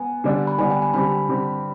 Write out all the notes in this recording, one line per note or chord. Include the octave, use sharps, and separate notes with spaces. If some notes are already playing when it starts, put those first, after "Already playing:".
Already playing: B3 G#5
D3 G3 B3 D4
B5
D3 G3 B3 D4 G#5
G5
G#5
D3 G3 C4 G4 B5
D3 G3 C4 G4